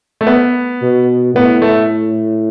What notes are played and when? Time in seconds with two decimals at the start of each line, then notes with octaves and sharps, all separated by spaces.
0.21 A3
0.27 B3
0.82 B2
1.35 A2 B3
1.62 A3